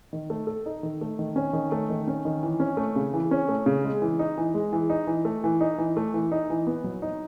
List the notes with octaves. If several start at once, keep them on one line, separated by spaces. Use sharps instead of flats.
D#3
A3
A4
D#4
D#3
A3
D#3
C#4
D#3
A3
D#3
C#4
D#3
E3
C#4
A3
C#3
E3
C#4
A3
C#3
G#3
E3
D#4
E3
G#3
E3
D#4
E3
A3
E3
D#4
E3
A3
E3
D#4
E3
B3
F#3
D#4